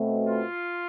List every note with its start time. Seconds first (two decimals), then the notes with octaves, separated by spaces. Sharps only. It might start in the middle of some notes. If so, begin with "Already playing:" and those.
Already playing: B2 A3 C4
0.28 F4